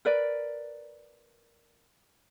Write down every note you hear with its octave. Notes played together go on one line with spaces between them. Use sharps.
A#4 B4 D5